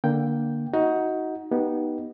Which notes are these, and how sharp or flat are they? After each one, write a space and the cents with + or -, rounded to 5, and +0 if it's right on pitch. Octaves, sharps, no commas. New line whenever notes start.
D3 +0 A#3 +10 G5 +0
D#4 +20 F#4 +0
B3 -15 D#4 +0 G4 -20